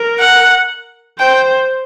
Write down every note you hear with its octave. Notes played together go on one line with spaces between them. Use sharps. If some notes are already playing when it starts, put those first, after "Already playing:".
Already playing: A#4
F#5
C5 G5